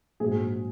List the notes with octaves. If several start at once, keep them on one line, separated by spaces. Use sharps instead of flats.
A#1 G#2 F#3 G#4